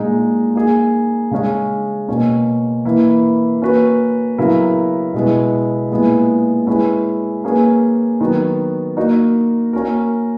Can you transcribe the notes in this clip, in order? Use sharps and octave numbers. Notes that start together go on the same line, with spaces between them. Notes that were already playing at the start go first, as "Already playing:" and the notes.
Already playing: A#2 G#3 D#4
A#3 D#4 G#4
C#3 G#3 C#4
B2 A#3 C#4
E3 A#3 E4
A#3 C#4 F#4 B4
C#3 F#3 B3 E4 A#4
B2 G#3 B3 E4
A#2 G#3 B3 E4 G#4
G#3 C#4 E4 B4
A#3 C#4 G#4 B4
D#3 F#3 B3 F#4
A#3 D#4 F#4 A#4
A#3 C#4 F#4 A#4